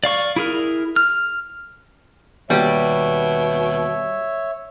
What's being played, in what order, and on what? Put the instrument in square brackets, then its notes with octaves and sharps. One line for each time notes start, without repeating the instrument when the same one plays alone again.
[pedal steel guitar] D5 F5 C#6
E4 G#4 A#4
F6
[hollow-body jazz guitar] D#2 G4 [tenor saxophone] B2 [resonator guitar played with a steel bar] G3 [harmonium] C#5 E5